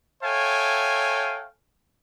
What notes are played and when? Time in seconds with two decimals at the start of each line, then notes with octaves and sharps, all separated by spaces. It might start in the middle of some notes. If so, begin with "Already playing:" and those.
0.23 A4 C#5 E5 F5 G5 G#5